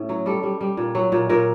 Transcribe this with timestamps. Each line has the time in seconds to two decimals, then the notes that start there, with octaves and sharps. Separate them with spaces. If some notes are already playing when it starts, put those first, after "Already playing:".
Already playing: A2 C#4
0.09 F#3
0.26 G3 A4
0.43 G3
0.61 G3
0.77 A#2
0.95 F#3
1.12 A#2
1.30 A#2 A#4